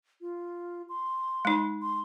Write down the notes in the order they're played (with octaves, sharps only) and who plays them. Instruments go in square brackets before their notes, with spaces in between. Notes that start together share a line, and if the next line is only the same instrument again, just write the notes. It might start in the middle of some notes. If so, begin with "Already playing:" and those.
[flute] F4
C6
[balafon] G#3 D#4
[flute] C6